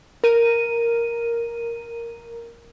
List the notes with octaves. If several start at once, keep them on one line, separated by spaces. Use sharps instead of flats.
A#4 D#7